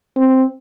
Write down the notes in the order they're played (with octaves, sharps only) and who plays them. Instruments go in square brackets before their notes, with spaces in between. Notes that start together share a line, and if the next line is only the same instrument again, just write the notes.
[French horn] C4